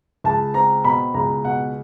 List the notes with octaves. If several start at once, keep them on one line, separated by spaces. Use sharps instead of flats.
C#2 A5
C4 A#5
B2 B5
C#2 A#5
B2 F#5